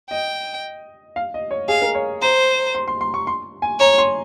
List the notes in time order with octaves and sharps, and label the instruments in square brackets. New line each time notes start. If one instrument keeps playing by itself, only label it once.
[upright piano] D#5 [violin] G5
[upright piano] F5
D#5
C#5
[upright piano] G#4 [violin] F5
[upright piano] A#4
C#5
[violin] C5 [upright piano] A#5
[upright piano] C6
C6
C6
C#6
C6
G#5
[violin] C#5 [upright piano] A#5
[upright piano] C6